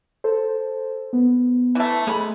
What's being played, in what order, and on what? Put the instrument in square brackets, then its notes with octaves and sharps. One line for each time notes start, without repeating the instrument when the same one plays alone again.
[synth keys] A4 C5
B3
[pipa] E3 A3
[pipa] G#3 B5 [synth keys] A3